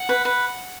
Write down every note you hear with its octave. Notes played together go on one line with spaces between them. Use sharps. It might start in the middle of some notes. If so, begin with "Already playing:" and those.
Already playing: F#5
B4
B4